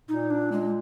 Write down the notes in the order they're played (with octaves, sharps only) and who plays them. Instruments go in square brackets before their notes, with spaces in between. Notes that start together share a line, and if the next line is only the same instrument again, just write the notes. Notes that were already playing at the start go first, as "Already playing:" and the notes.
[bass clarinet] A#2 [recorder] D#4
[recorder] D4
G#3